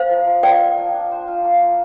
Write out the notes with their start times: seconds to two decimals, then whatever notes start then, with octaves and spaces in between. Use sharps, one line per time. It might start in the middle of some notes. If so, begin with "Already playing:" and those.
Already playing: C4 A#4 C5 F5
0.10 F3
0.27 F3
0.43 F3 D5 G5
0.61 C4
0.77 F3
0.94 D4
1.11 C5
1.28 F4
1.44 A#3
1.61 F3